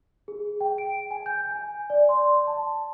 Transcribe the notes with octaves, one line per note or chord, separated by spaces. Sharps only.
G#4
G5
D7
G#5
G6
G#5
D5
C6
A5